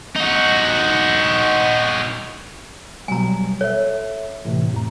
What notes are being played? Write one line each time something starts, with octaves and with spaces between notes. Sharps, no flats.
D#4 F#4
B2 F#3 G3 G#5 A#5
A4 C#5 E5
A2 C3 E3
F2 A2 A#5